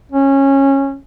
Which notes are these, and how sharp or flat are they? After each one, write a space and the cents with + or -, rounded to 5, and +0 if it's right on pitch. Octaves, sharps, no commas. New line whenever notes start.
C#4 -20